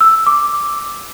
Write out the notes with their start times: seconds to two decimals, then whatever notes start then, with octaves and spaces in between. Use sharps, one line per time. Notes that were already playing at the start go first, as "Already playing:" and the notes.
0.01 E6
0.26 D6